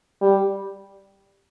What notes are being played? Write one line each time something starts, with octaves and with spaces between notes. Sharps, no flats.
G3